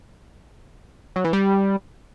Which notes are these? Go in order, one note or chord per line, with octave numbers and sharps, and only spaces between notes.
F#3
E3
G3